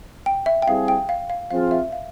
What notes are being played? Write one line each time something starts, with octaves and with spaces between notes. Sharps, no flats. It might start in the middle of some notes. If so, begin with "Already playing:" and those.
G5
E5
G5
G3 C4 E4 G#4 F5
G5
F5
F5
F3 C4 F4 G#4 F5
E5
F5